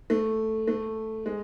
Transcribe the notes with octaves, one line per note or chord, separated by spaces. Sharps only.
A3
A3
G#3